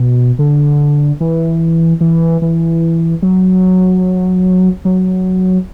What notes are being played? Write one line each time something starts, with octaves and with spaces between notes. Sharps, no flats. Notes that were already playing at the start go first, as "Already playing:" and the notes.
Already playing: B2
D3
E3
E3
E3
F#3
F#3